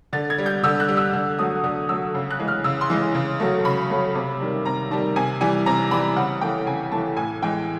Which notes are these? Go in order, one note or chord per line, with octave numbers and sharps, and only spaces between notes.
D3 A6
G#6
G3
G6
D3 E6
F#6
G3
E6
D3
F#3 A3 D#6
D3 D#6
F#3 A3 E6
C#3
F#6
E3 G#3
F6
C#3 E6
C6
E3 G#3
C#3
F#3 A3
C#3 B5
F#3 A3
C3
D#3 G3
C3 A#5
D#3 G3 A5
C3 G#5
E3 G3 G#5
C3 A#5
E3 G3 B5
C#3 F#5
E3 A3 G5
C#3 G#5
E3 A3 A5
A2 G#5
E3 G#3 G5